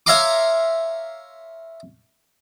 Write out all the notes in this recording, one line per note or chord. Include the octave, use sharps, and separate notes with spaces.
C#5 E5 F5 A#5 C6 D6